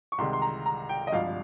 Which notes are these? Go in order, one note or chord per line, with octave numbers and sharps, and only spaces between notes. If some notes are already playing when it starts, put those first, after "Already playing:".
C#6
C2 C3 D#3 G#3 C6
C6
A#5
A#5
G5
D#5
G#1 G2 F3 F5